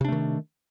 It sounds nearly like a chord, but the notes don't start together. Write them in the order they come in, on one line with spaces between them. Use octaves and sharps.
C3 D4 A3 D#3